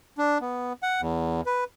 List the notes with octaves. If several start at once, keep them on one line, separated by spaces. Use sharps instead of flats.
D4
B3
F#5
E2
B4